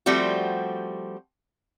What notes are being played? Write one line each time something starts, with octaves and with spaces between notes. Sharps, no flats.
F3 G3 A3 C4 F#4